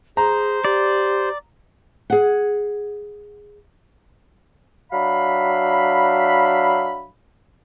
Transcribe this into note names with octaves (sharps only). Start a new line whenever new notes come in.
G#4 C5 A#5
G4 D5
G#4 F#5
F#3 D4 E5 F5 B5